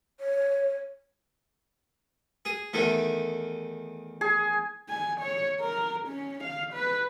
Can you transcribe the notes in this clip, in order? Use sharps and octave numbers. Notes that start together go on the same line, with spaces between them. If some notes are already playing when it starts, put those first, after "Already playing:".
C#5
G#4
E2 D#3 A3
G#4
G#5
C#5
A#4
C#4
F5
B4